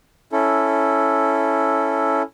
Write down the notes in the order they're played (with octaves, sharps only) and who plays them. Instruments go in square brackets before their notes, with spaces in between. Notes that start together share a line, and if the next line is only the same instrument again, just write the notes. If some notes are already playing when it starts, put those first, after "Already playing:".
[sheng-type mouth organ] C#4 E4 A4